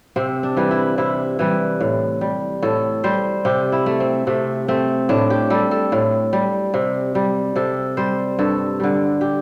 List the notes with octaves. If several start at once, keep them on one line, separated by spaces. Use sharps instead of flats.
C3 C4
D4
E3 G3
E4
C3 E4
E3 G3
A2
G3
A2 A4
G3 C5
C3 G4
E4
A3
C4
C3 A3
A3 C4
A2 D4
G4
G3 A4
A4
A2
G3
C3
G3
C3 A4
G3 C5
G2 A4
D3 G3
G4